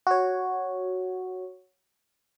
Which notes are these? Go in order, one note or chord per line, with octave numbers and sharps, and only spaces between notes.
F#4 C#5